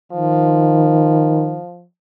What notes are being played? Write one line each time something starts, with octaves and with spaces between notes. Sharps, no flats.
D#3 F3